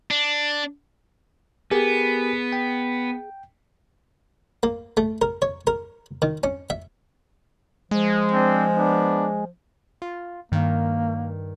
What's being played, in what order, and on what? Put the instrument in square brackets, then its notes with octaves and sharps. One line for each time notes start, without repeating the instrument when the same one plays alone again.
[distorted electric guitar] D4
[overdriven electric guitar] B3 [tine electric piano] G4 A#4 G#5 [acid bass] G#4
[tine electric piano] G5
[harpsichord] A#3
A3
A#4
C#5
A#4
D#3
C#4
E5
[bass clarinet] F3 [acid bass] G#3
[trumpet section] C4 D4
B3 D4
[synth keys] F4
[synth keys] G2 D#3 [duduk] A#3